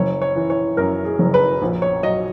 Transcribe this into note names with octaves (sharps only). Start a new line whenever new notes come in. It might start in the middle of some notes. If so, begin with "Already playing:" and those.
Already playing: F#1 C#5
C#5
E3
C#5
F#2 A#4
G#4
F#1
B4
A#1
C#5
F#3 D#5